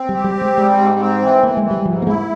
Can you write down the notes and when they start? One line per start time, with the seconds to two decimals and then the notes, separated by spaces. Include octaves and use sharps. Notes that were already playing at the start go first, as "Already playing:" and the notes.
Already playing: C4
0.09 G3
0.14 G4
0.24 G3
0.35 C4
0.41 G#3
0.57 G3 G#3
0.78 G#2
0.99 C4
1.22 E3
1.42 E3 A#3
1.57 G#3
1.64 E3
1.71 G3
1.85 G#2 F3
2.02 A#3
2.07 G#3 E4